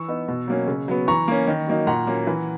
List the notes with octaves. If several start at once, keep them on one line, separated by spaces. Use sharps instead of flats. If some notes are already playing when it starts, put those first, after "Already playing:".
Already playing: E3 C#6 E6
B3 D#4
B2
F#3 A#3 C#4
C#3
F#3 B3
E3 A#5 C#6
A#3 C#4
D#3
F#3 A#3 D#4
A#2 F#5 A#5
F#3 A#3 C#4
E3